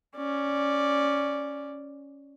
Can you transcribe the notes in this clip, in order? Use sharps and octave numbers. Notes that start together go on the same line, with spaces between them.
C#4 D5